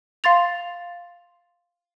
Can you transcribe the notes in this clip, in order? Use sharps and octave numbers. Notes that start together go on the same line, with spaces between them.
F5 C6 A6 F7